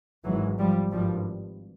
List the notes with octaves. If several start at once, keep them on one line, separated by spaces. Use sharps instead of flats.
G#1 G#2 E3 F#3
F3 G3
G#1 G2 F3 G3